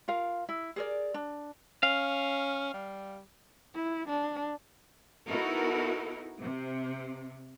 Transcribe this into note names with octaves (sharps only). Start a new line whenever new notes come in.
F4 A#4 F5
E4
G#4 A#4 D5
D4
C#4 F5
G3
E4
D4
B3 D#4 E4 F#4 A4 A#4
C3